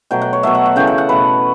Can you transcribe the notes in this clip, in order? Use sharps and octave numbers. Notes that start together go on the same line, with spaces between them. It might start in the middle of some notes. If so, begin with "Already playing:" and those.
B2 F#3 A3 G5
F#5
C#5
B2 F#3 A3 E5
F#5
F#5
C#3 E3 A3 G5
F#5
F#5
B2 A3 B4